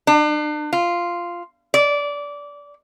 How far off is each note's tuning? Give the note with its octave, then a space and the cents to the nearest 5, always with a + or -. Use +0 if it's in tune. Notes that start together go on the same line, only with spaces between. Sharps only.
D4 +40
F4 -5
D5 -20